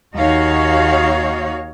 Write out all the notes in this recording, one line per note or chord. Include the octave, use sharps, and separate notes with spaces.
D#2 D#4 F#4 C#5 F5